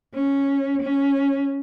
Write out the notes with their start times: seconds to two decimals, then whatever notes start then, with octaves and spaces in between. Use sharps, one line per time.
0.15 C#4
0.82 C#4